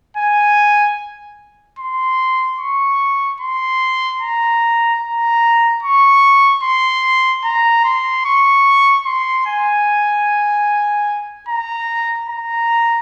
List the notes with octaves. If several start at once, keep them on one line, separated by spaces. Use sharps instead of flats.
G#5
C6
C#6
C6
A#5
A#5
C#6
C6
A#5
C6
C#6
C6
G#5
A#5
A#5